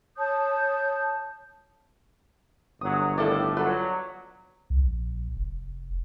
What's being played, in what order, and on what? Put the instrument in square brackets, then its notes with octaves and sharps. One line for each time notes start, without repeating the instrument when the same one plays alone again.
[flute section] C#5 A5 D#6 G6
[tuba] G1 [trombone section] E2 F#3 [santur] D#6
[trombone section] A2 [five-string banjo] D#3 E4 A4 [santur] D5 F5
[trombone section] F#3 [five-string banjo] F4 A4 [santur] B4
[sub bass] C2
A#1
F1